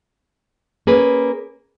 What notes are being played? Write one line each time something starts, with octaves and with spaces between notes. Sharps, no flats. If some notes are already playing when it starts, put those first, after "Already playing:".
A#3 C#4 G#4 B4